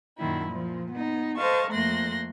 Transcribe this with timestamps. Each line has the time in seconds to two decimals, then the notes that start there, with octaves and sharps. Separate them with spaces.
0.17 F#2 A#2 D#3 E4
0.46 A#2 F3
0.91 B3 D#4
1.36 A4 C5 D#5 F5 A5 C#6
1.70 F2 A3 A#3 C6 F#6 A#6